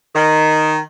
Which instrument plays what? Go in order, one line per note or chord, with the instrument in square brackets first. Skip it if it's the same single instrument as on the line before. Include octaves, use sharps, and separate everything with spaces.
[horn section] D#3